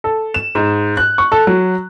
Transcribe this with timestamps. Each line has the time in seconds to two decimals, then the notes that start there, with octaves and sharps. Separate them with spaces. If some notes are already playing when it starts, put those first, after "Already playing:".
0.04 A4
0.34 E7
0.55 G#2
0.97 F#6
1.18 C#6
1.32 A4
1.47 F#3